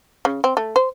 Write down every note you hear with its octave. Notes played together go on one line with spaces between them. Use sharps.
C#3
C4
A3
C5